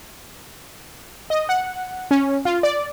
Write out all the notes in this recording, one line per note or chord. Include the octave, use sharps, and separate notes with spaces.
D#5
F#5
C#4
F4
D5